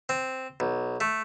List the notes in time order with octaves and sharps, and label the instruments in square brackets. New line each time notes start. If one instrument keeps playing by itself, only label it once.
[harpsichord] C4
B1
A3